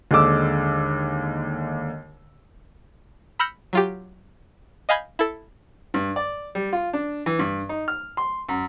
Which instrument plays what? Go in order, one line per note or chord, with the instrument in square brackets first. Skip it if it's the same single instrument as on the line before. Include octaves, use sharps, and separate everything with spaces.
[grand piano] D#2 D3 G#3 D6 E6
[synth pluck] B5 E6 F6 G6 A#6 C#7
F#3 F4 G4
D#5 F5 G#5 B5 G6 G#6
E4 A4
[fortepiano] G2
D5
G3
F4
D4
E3
G2
D#4
F6
C6
F#2